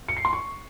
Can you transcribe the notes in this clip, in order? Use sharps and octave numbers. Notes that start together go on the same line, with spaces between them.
C#7
C7
C6
C#6